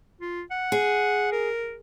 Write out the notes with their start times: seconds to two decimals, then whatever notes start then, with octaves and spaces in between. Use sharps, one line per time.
0.21 F4
0.51 F#5
0.72 G#4
1.32 A#4